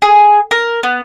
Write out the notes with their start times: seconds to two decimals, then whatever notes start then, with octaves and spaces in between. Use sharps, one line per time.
0.02 G#4
0.51 A#4
0.83 B3